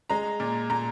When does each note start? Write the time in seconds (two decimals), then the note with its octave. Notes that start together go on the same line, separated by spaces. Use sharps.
0.10 G#3 A#5
0.40 A#2
0.70 A#2 A#5